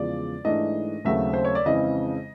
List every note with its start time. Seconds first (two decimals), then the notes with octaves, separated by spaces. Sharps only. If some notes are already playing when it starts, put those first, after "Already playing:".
Already playing: E2 C#3 F3 G#3 D5
0.45 G#2 E3 A3 D4 D#5
1.05 D#2 C#3 F#3 A3 C4 E5
1.34 C5
1.45 C#5
1.55 D5
1.65 F2 C#3 E3 G#3 C4 D#5